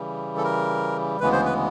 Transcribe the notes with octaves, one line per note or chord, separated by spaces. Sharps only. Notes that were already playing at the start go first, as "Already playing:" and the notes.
Already playing: C#3 E3 G3
A4
A#4
D2 C#3 E3 G#3 B3 B4
C5
B4